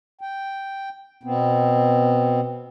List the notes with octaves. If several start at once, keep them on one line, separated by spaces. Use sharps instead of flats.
G5
B2 B3 C4